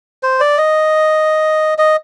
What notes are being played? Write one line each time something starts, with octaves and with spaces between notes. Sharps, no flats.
C5
D5
D#5
D#5